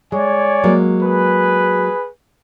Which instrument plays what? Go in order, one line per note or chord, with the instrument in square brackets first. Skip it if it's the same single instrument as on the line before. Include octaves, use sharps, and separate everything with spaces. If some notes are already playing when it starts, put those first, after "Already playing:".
[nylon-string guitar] G#3 [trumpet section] C#5 D5 G#5
[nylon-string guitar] F#3 G#3 A#3
[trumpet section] G#4 B4